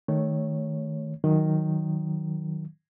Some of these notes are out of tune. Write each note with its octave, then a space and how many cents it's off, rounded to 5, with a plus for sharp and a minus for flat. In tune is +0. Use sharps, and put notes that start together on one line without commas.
D#3 +0 A3 +0 C#5 +0
D#3 +0 F#3 -5